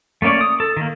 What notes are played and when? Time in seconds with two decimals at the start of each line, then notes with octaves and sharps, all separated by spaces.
0.22 A3 A#3 C#4 C#5 D5
0.41 D#6
0.60 A4
0.77 D#3 A#3